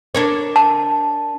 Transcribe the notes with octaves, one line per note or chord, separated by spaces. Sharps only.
D4 A#4 C#5
A5